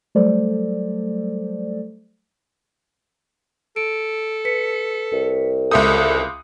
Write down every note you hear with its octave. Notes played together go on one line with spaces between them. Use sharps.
F#3 G3 A3 A4 C5 D5
A4 D7
B4 B6 C#7
C2
C#2 A4 E5 C6 D6 D#6 G6